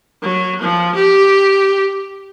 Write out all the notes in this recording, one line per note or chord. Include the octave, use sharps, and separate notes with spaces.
F#3
F3
G4